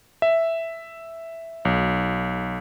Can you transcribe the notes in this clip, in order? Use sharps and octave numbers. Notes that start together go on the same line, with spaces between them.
E5
B1